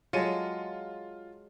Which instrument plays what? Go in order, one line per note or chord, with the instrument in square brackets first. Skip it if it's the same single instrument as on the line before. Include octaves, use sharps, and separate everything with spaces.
[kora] F#3 G#3 A4 [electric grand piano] F4 C#7 D#7